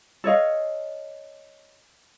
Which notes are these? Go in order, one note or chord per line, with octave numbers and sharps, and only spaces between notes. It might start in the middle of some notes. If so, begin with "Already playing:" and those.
A4 C#5 D#5 F5